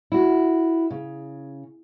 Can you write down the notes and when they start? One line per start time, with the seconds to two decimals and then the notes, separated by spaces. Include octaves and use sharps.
0.12 E4 F#4
0.91 C#3